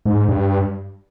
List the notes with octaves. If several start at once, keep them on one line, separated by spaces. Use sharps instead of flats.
G#2
G#2
G2